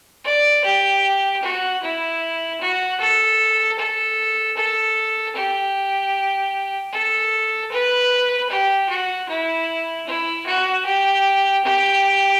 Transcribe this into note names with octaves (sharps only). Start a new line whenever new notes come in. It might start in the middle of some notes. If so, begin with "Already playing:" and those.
D5
G4
F#4
E4
F#4
A4
A4
A4
G4
A4
B4
G4
F#4
E4
E4
F#4
G4
G4